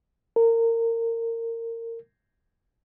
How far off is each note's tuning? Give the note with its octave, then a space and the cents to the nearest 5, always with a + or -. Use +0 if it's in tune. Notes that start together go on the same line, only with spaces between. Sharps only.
A#4 -25